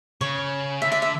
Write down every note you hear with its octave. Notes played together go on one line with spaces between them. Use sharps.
C#3 C#5
D3 E5
E5
E5